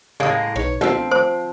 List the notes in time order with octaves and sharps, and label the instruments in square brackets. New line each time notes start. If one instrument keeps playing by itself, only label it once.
[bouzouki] A2 G#3 A#3 [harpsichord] C#3 D#6
[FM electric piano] B1 D#4 B4 [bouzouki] C#5
[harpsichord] B1 E5 [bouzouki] F3 C4 [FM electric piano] A3 D4 F4
[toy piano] C5 [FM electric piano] F5 [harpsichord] D6